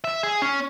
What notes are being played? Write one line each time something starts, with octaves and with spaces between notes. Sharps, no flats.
E5
G#4
C#4